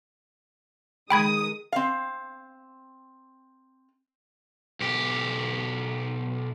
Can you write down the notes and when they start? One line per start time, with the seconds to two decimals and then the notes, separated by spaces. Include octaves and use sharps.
1.10 D#3 G#3 G5 B5 D#6 G#6
1.72 C4 F5
4.80 B1 G4